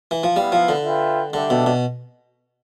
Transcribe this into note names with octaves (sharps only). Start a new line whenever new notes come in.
E3
F3
G3 B3 E4 B4 F5
F3
D3
F4 B4 E5 G5
D3 G3 D4 A4 E5 G5
B2
B2